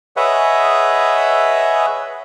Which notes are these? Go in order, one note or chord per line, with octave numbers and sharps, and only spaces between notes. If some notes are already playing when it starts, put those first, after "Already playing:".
G#4 B4 C#5 D#5 E5 F#5